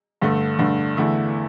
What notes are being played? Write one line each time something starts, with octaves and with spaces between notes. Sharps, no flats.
G2 D3 A3
G2 D3 A3
E2 D3 A3 E4